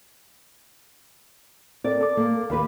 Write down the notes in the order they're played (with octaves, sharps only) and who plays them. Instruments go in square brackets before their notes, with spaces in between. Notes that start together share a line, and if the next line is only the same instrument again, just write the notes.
[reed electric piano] C4 A4 A#4 [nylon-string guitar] D5
[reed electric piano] A4 D6
[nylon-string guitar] A#3
[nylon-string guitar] D#2 B4 [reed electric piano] F5 B5 D6